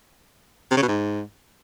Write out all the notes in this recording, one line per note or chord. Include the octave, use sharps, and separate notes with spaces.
C3
C#3
B2
G#2